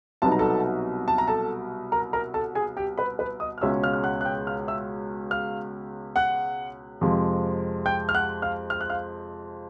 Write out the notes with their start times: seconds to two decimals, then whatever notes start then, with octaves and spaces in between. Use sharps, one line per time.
0.22 C2 B2 F#3 B3 D#4 A5
0.32 A#5
0.39 A4 A5
1.08 A5
1.18 A#5
1.28 A4 A5
1.92 A#4 A#5
2.13 A#4 A#5
2.34 A4 A5
2.55 G#4 G#5
2.77 G4 G5
2.97 B4 B5
3.19 B4 B5
3.40 D#5 D#6
3.58 F6
3.61 C#2 B2 G#3 C#4 E5 E6
3.83 F5 F6
3.93 F6
4.04 F#5 F#6
4.21 F#6
4.25 G5 G6
4.47 F5 F6
4.68 E5 E6
5.31 F5 F6
6.16 F#5 F#6
7.01 F2 C3 F3 G#3
7.86 G5 G6
8.09 F6
8.14 F#5 F#6
8.42 F5 F6
8.70 F6
8.81 F#6
8.90 F5 F6